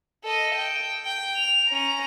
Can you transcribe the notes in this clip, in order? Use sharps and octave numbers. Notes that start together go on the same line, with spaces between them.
A4 D#5
G5
G5
F7
C#4 A#5